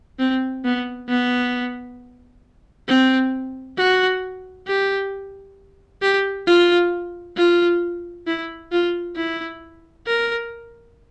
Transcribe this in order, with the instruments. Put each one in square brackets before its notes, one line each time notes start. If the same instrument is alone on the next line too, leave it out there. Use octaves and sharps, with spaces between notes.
[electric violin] C4
B3
B3
C4
F#4
G4
G4
F4
F4
E4
F4
E4
A#4